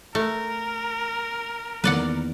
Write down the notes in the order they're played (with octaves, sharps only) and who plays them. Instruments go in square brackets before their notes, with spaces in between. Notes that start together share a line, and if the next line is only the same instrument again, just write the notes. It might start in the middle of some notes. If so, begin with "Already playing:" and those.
[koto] A3 [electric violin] A#4
[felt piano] E2 D#3 A#3 [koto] B4 D5 F#5